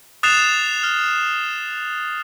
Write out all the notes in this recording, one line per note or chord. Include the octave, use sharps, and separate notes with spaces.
D#6 F#6 A6 C7 E7 F7
F6